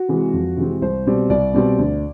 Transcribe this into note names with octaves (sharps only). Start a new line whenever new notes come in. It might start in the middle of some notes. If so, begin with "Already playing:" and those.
Already playing: F#4
C3 E3 G#3 C4
F2
C3 E3 G#3 C4
C2 C5
B2 G3 C4
C2 D5
B2 G3 C4
D2